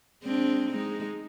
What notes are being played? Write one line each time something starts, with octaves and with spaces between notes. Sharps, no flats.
G#3 C4 D4
G#3 D#4